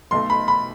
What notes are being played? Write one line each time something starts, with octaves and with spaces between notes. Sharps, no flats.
B1 B2 A3 C6
B5
B5